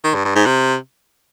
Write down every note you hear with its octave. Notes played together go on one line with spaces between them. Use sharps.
D#3
G2
G2
G#2
C3